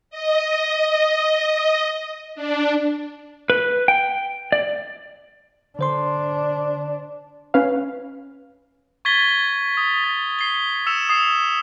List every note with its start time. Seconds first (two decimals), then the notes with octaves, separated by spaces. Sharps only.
0.10 D#5
2.35 D4
3.50 B4
3.88 G5
4.52 D5
5.79 D3 D4 C5 C6
7.54 C#4 B4 F5
9.05 C#6 G#6 A6 B6 G7
9.77 D#6
10.04 A6
10.39 C7 G7
10.86 E6 C#7 E7 F7
11.09 D#6 E6 C7 F7